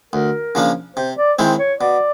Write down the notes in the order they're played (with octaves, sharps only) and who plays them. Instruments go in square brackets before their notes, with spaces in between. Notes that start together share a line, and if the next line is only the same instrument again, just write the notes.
[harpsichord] D2 [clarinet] A#4
[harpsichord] C#3 F3 A#3 D4
[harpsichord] C3 [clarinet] C5
[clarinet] D5
[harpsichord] D#3 G#3 C4 E4 [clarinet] C5
[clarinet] C#5
[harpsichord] B2 [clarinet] D5